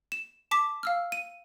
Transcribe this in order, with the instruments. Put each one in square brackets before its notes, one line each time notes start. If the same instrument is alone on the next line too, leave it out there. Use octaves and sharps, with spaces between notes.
[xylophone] E7
A5 D6 B6
F5 E6 F6
D#7